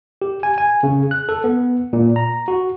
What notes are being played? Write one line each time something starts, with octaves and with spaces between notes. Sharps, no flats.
G4
G#5
G#5
C#3
F#6
A4
B3
A#2
A#5
F#4